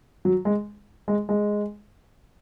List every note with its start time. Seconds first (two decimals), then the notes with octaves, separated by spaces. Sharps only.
0.25 F#3
0.45 G#3
1.08 G#3
1.29 G#3